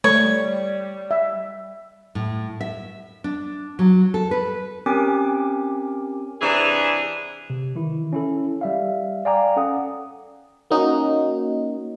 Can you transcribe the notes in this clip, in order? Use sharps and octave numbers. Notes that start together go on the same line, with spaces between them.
G3 A3 C#5
E5
A2
E5
D4
F#3
A4
B4
C4 C#4 G4 A#4 G#5 D6
C3 E3 D4 G#4
C3
D#3 E3 E4
C#4 E4 A4
G3 E5 F5
D5 F5 G5 G#5 A#5 D6
C#4 A4 F#5 D#6
A#3 C#4 D#4 F#4